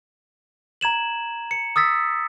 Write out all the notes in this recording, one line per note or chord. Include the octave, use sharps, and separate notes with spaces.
A#5 G#6 E7 F#7
C#7
D#6 E6 A6 B6